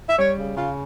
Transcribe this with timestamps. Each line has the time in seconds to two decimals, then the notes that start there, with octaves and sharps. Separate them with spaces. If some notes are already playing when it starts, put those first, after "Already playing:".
0.09 E5
0.18 G3 C#5
0.38 C#3
0.57 C#3 F4